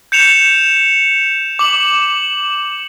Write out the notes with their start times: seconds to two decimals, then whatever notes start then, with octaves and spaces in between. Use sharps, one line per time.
0.12 G6 C#7 E7 F7
1.59 D6 F#7